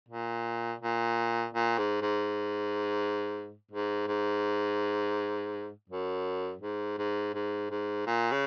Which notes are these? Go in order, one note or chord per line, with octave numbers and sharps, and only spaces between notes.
A#2
A#2
A#2
G#2
G#2
G#2
G#2
F#2
G#2
G#2
G#2
G#2
A#2
C#3